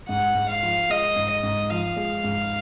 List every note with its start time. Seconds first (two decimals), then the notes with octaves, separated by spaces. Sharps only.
0.09 G#2 F#5
0.35 G#2
0.49 F5
0.63 F3
0.89 G#3 D#5
1.16 G#2
1.30 D#5
1.43 G#2
1.70 F3 F5
1.96 G#3
2.24 G#2